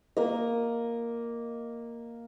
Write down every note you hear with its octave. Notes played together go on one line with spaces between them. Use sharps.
A#3 D#5